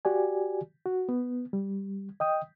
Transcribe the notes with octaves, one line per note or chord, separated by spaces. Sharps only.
F#4 G4 D5 G#5
F#4
B3
G3
D#5 G5 D#6